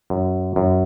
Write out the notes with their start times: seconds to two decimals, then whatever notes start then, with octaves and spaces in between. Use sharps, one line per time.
0.10 F#2
0.56 F#2